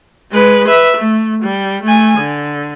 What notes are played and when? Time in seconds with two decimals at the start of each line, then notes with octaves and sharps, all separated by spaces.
0.32 G#3 B4
0.68 B4 E5
0.97 A3
1.43 G3
1.83 A3 G#5
2.19 D3